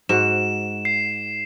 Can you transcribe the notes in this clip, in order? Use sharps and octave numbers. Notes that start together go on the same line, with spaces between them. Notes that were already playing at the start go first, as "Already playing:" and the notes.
G#2 F#4 E7
C7